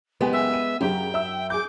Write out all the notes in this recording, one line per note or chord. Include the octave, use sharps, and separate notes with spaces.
F#1 G#3 B3 G4 G#5
E5
D#7
F#2 C#3 F#3 G4 G5
E5 E6
G#4 D6 G6